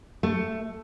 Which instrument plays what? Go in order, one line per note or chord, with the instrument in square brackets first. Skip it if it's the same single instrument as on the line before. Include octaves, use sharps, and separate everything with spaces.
[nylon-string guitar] A3